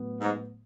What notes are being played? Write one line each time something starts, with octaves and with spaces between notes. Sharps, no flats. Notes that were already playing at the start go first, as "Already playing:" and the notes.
Already playing: A2 F#3 B3
G#2